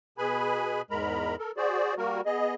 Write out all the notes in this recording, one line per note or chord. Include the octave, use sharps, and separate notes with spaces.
B2 G#4 B4 G#5 B5
E2 G#2 G#3 A#4 A#5 B5
A4 A#4
F#4 G#4 C5 D5
G3 A#3 F#4 A#4
B3 G#4 D#5